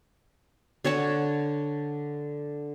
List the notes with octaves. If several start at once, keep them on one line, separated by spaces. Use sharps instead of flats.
D3 C#5 F#5 A5